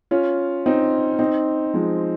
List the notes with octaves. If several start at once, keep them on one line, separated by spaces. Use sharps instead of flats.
C#4 F4
C4 D#4
C4 D#4
F3 G#3